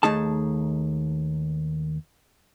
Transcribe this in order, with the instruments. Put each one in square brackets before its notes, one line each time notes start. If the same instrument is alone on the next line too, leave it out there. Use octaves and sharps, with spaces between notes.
[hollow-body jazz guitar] D#2 A3 D#4 G#4 A5